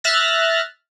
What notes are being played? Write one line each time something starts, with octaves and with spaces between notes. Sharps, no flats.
E5 F6 F#6 A6 A#6